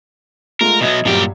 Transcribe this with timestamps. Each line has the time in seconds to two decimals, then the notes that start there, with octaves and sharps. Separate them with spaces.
0.61 G#3 A3 F4 A#4
0.81 B2 F#3 D#5 E5 G#6
1.05 G2 A#2 F#3 G3 G4